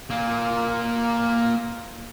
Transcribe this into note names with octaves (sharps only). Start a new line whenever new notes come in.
A#3 F4